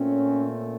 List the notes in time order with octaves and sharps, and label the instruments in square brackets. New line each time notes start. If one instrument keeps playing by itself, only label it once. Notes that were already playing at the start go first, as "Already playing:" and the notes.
Already playing: [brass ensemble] A#2 A3 C4 C#4